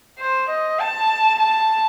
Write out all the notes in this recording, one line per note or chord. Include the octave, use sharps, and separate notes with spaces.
C5
D#5
A5
A5